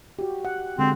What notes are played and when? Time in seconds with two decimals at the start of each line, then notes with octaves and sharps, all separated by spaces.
0.19 F#4 G4
0.45 F#5
0.79 D3 G#3 C4